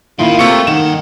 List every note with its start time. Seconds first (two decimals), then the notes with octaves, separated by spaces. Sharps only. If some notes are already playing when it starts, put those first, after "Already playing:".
0.19 D#3 A#3 E4 F4
0.39 C3 A3 A#3 A4 C#6 C#7
0.67 G2 D#3 F#5 E7